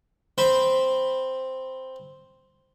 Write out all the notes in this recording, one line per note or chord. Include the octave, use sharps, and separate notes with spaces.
C4 C5 B5